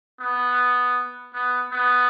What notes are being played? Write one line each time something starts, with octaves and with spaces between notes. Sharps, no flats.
B3
B3
B3